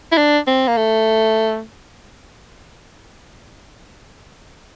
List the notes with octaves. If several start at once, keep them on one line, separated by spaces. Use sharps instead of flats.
E4
D4
C4
A#3
A3